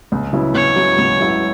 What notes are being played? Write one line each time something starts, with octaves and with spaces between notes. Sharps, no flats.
C#2
C#3 F#3 B3 E4
C#2 C#5
C#3 F#3 B3 E4
C#2
C#3 F#3 B3 E4